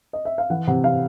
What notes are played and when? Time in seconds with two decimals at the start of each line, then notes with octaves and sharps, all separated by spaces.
0.13 D#5
0.25 E5
0.38 F5
0.50 E3 F#5
0.67 C3 F#5
0.84 E3 F5